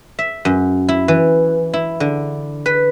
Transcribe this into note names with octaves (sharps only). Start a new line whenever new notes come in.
E5
F#2
E4
E3
E4
D3
B4